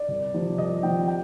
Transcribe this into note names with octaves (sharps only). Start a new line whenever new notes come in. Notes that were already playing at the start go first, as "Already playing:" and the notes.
Already playing: D5
C2
C3 F3
C2 D#5
C3 F3 G5
G5